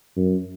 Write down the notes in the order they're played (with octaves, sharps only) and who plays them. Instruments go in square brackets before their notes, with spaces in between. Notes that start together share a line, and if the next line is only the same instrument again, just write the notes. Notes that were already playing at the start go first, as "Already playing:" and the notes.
[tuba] F#2